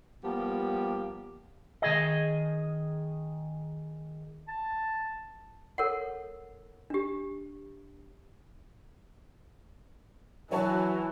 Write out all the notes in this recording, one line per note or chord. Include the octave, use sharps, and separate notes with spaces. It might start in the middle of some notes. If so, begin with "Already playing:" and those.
F3 G3 A#3 B3 G4
D#3 G#4 D#5
A5
A4 A#4 C#5 F#5
D4 G4
E3 F#3 F#4 C#5 G#5 A5